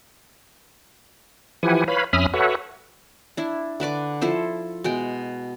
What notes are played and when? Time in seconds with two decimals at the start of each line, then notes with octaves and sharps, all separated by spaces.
1.63 E3 F3 E4 G4 F#5 G#5
1.88 B4 C#5 F5 B5
2.13 F2 C#4 E5 B5 D#6 F6
2.34 F#4 A4 B4 C#5 E5 F#5
3.37 D4 E4
3.80 D3 B4 D5 D6
4.21 F3 E4 A4 C5
4.84 B2 G#3 G5